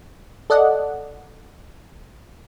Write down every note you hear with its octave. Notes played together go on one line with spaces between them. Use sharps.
A4 D5 D#5 F#5